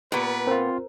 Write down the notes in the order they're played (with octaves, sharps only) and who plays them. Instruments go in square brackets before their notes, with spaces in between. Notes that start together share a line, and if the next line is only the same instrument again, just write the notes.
[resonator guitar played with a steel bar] A#2 B3 [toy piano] G4 [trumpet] B4
[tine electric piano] C4 F4 [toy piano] A#4 C5 A#5